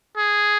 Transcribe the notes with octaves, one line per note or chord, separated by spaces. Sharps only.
G#4